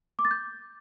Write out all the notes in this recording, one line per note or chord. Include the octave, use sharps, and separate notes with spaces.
D6
A6
G6